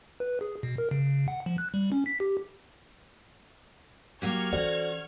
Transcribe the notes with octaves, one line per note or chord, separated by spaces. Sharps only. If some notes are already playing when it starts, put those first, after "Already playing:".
B4
G#4
B2
A#4
C#3
F#5
F3
F#6
G3
C#4
B6
G4
F#3 A#3 G4 C#6 F6 G#6
E3 C#4 F#4 A4 C5 D5